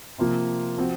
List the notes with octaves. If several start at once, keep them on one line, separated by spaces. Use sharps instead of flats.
C3 F3 A#3 F4
F3 C4 F#4